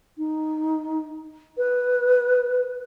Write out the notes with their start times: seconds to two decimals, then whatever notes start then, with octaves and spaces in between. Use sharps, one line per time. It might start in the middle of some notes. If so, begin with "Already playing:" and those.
0.18 D#4
1.58 B4